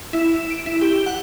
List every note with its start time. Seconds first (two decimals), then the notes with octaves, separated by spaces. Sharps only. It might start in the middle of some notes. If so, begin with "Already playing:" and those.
0.13 E4
0.35 E7
0.51 D7
0.66 E4
0.81 G4
1.06 F#5